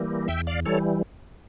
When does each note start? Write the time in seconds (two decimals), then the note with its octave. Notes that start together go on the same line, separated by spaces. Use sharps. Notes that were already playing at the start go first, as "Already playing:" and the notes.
Already playing: E3 G3 A#3
0.28 E2 E5 G5
0.47 D5 F5
0.65 E3 G3 A4 C#5